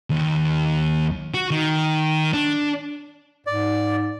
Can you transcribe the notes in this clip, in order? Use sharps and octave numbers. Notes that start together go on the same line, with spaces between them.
D#2
F#4
D#3
D4
G#2 D5